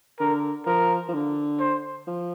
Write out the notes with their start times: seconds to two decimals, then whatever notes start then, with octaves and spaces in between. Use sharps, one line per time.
0.19 D3 A#4
0.66 F3 A#4
1.09 F3
1.14 D3
1.60 C5
2.07 F3